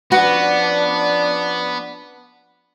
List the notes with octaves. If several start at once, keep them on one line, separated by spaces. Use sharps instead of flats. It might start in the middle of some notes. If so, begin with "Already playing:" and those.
F3 B3 C#4 D4 F#4 B4 C#6